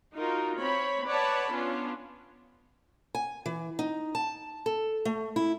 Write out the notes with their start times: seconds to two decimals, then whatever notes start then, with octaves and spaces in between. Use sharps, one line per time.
0.16 D#4 F4 F#4 A#4
0.60 C4 C#5 B5
1.08 B4 C#5 D5 F#5 A5 B5
1.51 B3 C#4 D4 F4
3.15 G#5
3.46 E3
3.79 D#4
4.15 A5
4.66 A4
5.05 A3
5.36 E4